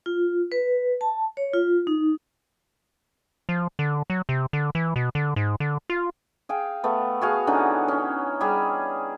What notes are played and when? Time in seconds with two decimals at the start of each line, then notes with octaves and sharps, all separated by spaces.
0.06 F4
0.52 B4
1.01 A5
1.37 C#5
1.53 F4
1.87 D#4
3.49 F3
3.79 D3
4.10 F#3
4.29 C3
4.53 D3
4.75 E3
4.96 B2
5.15 D3
5.36 G#2
5.60 D3
5.90 F4
6.49 G#4 F5 G5
6.84 A3 B3
7.21 F#4 G#4 F5
7.47 D3 E3 C#4 D#4
7.88 C#4
8.41 G3 G#4